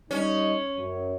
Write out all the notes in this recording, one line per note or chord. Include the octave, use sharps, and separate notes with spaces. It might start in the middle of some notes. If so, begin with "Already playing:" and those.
G3 C#4 D#4
F#2